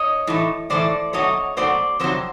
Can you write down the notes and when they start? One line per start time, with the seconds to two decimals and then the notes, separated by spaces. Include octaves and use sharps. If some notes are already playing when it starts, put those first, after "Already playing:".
Already playing: C#5 D#5
0.27 A2 E3 A3
0.70 A2 E3 A3 C5 D5
1.13 B2 F#3 A3 C#5 D#5
1.57 B2 F#3 A3 C5 D5
2.00 F2 C3 F#3 C5